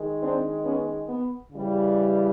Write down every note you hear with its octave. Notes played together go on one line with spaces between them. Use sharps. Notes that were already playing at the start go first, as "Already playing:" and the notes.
Already playing: D#3 G#3
C4 D4
B3 C#4
B3
C#3 E3 G3